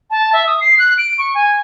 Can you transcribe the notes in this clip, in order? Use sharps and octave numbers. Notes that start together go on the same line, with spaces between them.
A5
E5
D#6
C7
F#6
D7
C#6
G#5